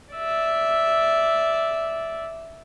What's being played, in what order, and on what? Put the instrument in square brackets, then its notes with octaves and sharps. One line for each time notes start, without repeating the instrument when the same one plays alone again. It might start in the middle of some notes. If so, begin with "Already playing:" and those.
[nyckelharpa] D5 E5